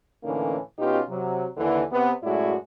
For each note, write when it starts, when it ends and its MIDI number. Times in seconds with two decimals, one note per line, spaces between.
0.24 0.57 45
0.24 0.57 50
0.24 0.57 52
0.24 0.57 58
0.24 0.57 61
0.24 0.57 63
0.79 1.01 47
0.79 1.01 59
0.79 1.01 61
0.79 1.01 63
0.79 1.01 65
0.79 1.01 67
1.09 1.46 48
1.09 1.46 54
1.57 1.83 39
1.57 1.83 50
1.57 1.83 52
1.92 2.12 48
1.92 2.12 59
2.23 2.54 42
2.23 2.54 45
2.23 2.54 56
2.23 2.54 64
2.23 2.54 66
2.23 2.54 74